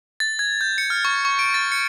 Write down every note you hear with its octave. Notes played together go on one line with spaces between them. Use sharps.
A6
G#6
G6
C#7
F6
C#6
C#6
D7
A6
C#7